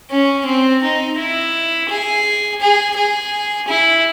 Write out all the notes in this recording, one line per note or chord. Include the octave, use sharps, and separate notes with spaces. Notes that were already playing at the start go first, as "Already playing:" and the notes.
C#4
C4
D#4
E4
G#4
G#4
G#4
E4